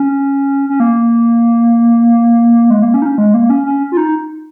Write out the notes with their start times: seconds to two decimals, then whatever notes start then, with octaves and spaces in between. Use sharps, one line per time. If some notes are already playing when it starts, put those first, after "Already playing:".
Already playing: C#4
0.69 C#4
0.80 A#3
2.70 G#3
2.82 A#3
2.94 C#4
3.02 D#4
3.06 C#4
3.18 G#3
3.34 A#3
3.50 C#4
3.66 C#4
3.92 F4
3.97 D#4